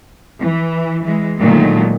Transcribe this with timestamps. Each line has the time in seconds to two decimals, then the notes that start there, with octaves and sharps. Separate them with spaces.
0.40 E3
1.05 E3 G#3
1.39 A#2 D3 D#3 F#3 G#3 A3